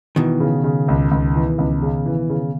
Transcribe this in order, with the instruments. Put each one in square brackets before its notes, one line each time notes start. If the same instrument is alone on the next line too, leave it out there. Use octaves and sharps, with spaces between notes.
[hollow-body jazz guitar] B2 D#3 [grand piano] E3
[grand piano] C#3
C#3
C#2
C#2
E3
C#2
C#3
E3
C#3